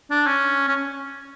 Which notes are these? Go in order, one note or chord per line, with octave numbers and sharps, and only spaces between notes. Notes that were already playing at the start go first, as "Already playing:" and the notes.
D4
C#4
C#4